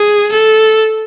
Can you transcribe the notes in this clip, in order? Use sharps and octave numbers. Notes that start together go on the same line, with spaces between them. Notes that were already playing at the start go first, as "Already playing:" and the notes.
Already playing: G#4
A4